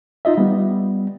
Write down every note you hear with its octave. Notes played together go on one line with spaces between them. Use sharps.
D#4 F4 D#5 E5
G3 B3